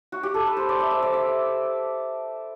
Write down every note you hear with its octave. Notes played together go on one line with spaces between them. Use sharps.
F#4
G4
A4
B4
C5
D5
E5
E5
D5
E5